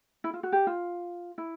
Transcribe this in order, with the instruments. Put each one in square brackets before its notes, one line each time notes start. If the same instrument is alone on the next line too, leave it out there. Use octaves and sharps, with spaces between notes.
[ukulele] E4
F4
F#4
G4
F4
E4